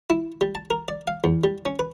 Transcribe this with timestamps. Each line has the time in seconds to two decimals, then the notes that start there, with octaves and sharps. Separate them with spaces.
0.10 E4
0.41 G3
0.55 A5
0.70 A#4
0.88 D5
1.07 F5
1.24 E2
1.44 G3
1.65 C#4
1.79 B4